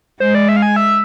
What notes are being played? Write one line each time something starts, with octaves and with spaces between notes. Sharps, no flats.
G#3 C5
D5
E5
F5
G#5
E5